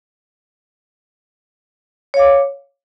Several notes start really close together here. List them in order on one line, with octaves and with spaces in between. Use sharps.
C#5 F5 D6